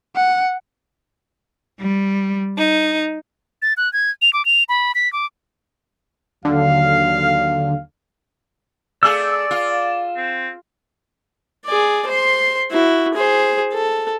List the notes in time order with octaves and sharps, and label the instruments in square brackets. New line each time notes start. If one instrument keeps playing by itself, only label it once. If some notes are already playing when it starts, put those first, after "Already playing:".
[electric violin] F#5
[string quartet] G3
D#4
[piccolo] A6
F#6
G#6
F7
D6
F7
B5
B6
D6
[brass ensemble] D#2 F#3 F5 [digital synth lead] D3
[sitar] A3 G#4 [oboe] D5 [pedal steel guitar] E6
[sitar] F4
[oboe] C4
[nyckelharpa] G#4 D5
C5 C6
E4 F#4
G#4 C5
A4